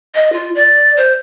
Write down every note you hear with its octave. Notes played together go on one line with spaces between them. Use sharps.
D#5
F4
D5
C5